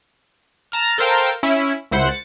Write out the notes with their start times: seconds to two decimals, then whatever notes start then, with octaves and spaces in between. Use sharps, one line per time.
0.72 A5 A#5 F6
0.98 A4 A#4 C5 F5 G5
1.43 C#4 E4
1.91 C#2 E4 C5 F#5
2.09 A6 C#7